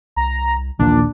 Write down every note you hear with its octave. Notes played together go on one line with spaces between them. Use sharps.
C2 A#5
A#1 D#2 A#2 E3 D4